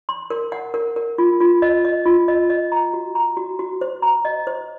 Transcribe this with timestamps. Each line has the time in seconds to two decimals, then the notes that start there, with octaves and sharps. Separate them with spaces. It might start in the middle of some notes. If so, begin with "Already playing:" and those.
0.09 C6
0.30 A#4
0.52 F#5
0.74 A#4
0.96 A#4
1.18 F4
1.40 F4
1.62 D#5
1.85 D#5
2.06 F4
2.28 D#5
2.50 D#5
2.72 A#5
2.94 F#4
3.15 A#5
3.37 F#4
3.59 F#4
3.81 C5
4.02 A#5
4.25 D#5
4.47 C5